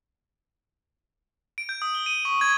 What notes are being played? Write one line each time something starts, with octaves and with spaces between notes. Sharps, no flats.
D7
G6
D#6
G7
D#7
C#6
G#6